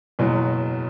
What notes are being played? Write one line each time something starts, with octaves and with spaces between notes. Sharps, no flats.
F#1 E2 B2 F#3